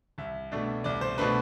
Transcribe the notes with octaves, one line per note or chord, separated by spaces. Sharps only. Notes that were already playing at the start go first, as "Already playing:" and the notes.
C2 E5
B2 A3 D4
C2 D5
C5
B2 A3 D4 B4